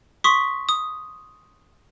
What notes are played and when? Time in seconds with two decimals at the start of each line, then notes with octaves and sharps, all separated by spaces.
0.24 C6 C#6 D#6 B6
0.69 D#6